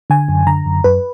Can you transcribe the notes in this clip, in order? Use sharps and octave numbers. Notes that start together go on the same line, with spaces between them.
D3 G#5
F#2
D3 A#5
F#2
F#2 B4